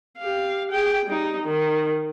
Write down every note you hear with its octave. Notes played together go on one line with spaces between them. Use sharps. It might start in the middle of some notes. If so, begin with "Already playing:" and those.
G4 F5
G#4 G5
G3 D#4
D#3